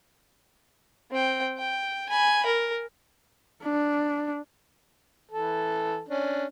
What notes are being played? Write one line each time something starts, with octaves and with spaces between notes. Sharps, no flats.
C4 G5
G5
G#5 B5
A#4
D4
E3 A4
C#4 D4